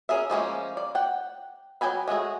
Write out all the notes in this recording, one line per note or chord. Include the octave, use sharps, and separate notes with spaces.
C#4 G#4 A#4 E5
F3 G#3 A#3 C#4
D5
F#5 G5
F#3 G#4 G5 G#5 B5
G#3 A3 F#4 G#4